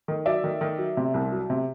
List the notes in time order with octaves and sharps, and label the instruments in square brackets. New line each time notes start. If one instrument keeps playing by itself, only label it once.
[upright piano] D#3
F#3 D5 E5
D#3
D#3
F#3
C3
C2
F#3
C3